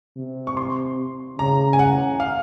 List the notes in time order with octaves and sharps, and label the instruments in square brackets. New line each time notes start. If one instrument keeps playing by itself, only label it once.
[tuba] C3
[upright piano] C#6
C6
[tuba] C#3 [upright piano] A#5
[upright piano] G#5
F#5
F5